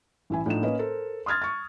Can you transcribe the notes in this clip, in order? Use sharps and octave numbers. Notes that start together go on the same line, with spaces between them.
A1 E4 G#5
A2 F3 D4 D#4 E7
A#3 C#4 B4 D#5
A4 A#4 C5
C6 D#6 F6 G#6 A6
C#6 A6